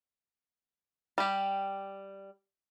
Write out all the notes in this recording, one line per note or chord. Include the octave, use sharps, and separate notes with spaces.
G3 G4